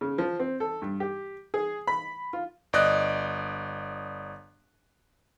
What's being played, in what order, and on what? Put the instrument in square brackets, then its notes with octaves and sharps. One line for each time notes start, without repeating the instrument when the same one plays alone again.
[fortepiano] C#3
F3
C4
A4
G2
G4
G#4
B5
F4
[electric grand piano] G1 D5 D#5 F#6